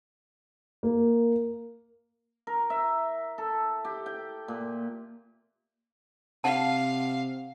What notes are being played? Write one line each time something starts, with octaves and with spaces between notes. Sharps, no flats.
A#3
A#4
E5
A4
G4
G5
A#2
C3 F5 F#5 A5